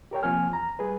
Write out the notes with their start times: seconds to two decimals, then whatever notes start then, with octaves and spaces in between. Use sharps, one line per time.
0.11 G4 A#4 C#5 G5
0.23 C2 F3 A#3 C4 G#5 F6
0.49 E2 A#5
0.79 G3 G#4 B4